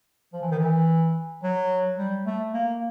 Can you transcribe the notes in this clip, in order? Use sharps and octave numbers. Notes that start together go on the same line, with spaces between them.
F3
E3
D#3
E3
F#3
G3
A3
A#3